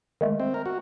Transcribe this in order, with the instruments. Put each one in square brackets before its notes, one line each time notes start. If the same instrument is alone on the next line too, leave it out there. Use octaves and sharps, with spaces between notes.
[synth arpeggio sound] D#3 G#3 A3
[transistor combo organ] C4
A#4
F#4